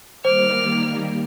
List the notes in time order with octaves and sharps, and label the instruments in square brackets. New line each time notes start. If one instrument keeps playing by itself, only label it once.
[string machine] D#3 G3 A#3 [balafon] C5 [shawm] D6 [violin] F6